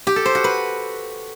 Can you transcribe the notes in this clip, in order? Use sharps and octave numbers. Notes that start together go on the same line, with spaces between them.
G4
A4
C5
F#4
B4